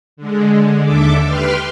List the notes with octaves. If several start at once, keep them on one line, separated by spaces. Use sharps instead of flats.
D3 G#3
D#2 D3 A4 E5 D6
G4 B4 G5 C6 F6